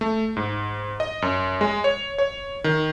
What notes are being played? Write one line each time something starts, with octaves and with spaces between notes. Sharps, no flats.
A3
G#2
D#5
F#2
G#3
C#5
C#5
D#3